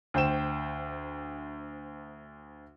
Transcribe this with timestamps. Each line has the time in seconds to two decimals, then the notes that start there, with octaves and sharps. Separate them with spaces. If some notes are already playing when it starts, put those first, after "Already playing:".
0.14 D2 C5 G5 E7